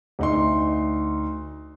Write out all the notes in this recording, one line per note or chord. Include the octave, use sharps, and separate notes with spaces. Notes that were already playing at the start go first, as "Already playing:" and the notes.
D2 D#4 C6